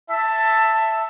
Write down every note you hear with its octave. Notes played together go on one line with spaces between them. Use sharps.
E5 A5